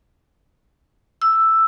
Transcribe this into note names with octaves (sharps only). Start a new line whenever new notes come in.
E6